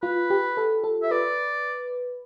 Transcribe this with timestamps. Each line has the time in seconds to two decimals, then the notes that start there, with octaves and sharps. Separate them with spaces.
0.02 F4 B4
0.30 G4
0.57 A4
0.84 A4
1.02 E5
1.11 B4 D5